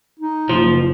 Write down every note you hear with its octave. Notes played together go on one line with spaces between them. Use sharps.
D#4
F#1 F3